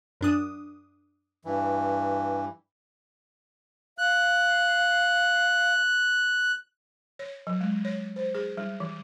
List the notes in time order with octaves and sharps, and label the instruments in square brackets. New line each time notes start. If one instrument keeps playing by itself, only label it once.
[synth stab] F#2 D4 D#6
[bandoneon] G2 E3
[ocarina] F5 [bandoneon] F#6
[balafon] C#5
F#3
G#3
C#5
C5
G#4
G3
E3